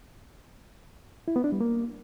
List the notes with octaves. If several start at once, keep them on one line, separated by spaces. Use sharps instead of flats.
E4
B3
D4
G3
A#3